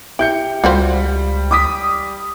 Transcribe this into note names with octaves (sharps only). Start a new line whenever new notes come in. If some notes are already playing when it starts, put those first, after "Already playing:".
E4 G4 G6 C#7
C#2 G3 F4 F#4 C5
D6 D#6 B6